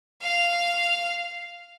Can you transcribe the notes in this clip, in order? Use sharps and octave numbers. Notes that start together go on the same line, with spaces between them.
F5